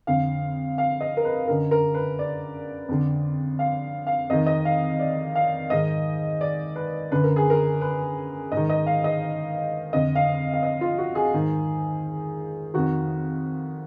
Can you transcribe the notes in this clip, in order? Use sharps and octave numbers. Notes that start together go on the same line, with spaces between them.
F2 D3 F5
F5
D#5
A#4
B4
F#2 D3 A#4
A#4
B4
D5
F2 D3
F5
F5
F2 D#3 D#5
D#5
F5
D5
F5
G#2 D#3 D#5
D5
B4
F#2 D3 B4
A#4
G#4
A#4
B4
G#2 D#5
D#3
D#5
F5
D#5
F2 D3 D#5
F5
F5
D#5
F4
F#4
G#4
G#2 D#3
F2 D#3 F#4